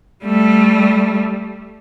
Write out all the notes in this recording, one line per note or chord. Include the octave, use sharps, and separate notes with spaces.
G3 A3